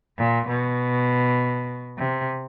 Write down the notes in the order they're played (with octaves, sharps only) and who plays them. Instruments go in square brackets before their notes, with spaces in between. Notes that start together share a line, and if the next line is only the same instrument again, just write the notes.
[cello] A#2
B2
C3